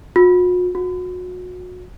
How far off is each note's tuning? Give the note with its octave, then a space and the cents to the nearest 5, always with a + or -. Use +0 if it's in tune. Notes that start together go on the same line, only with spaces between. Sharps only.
F#4 -45
F#4 -30